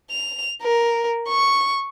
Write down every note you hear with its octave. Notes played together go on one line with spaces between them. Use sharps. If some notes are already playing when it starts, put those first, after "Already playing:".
F7
A#4
C#6